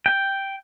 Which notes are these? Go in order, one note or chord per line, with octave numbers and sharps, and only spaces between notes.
G5